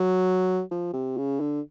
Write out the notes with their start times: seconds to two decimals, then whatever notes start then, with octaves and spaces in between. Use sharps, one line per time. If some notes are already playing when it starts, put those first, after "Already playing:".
Already playing: F#3
0.71 F3
0.93 C3
1.17 C#3
1.40 D3